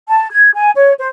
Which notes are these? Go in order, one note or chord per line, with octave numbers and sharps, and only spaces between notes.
A5
G#6
G#5
C#5
C5